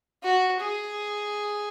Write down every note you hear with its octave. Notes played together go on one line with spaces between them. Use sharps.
F#4
G#4